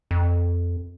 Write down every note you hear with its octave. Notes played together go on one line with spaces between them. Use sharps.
F2